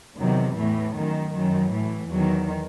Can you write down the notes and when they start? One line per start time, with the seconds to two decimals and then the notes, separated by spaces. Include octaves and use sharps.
0.18 E2 C3 D#3 F#3
0.58 A2 E3 A3
0.96 F#2 D#3
1.35 F#2 D#3 F#3
1.74 A2 E3
2.12 E2 D#3 F#3